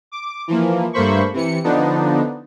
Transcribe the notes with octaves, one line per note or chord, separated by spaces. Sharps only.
D6
E3 F3 A#3
G2 A3 A#3 C5 B5 C#6
C3 E3 C#7
D3 F3 B3 D4 D#4